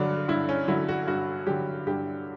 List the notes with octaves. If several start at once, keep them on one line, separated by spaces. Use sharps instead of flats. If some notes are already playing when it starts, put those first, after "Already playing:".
Already playing: G2 D3 F#3 D4
G2 E4
C#4
D3 F#3 E4
F#4
G2 F#4
D3 F#3 G4
G2 G4